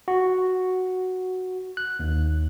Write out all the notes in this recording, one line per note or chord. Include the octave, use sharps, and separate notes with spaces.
F#4
F#6
D#2